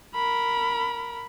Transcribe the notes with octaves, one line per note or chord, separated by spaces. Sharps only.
A#4 B5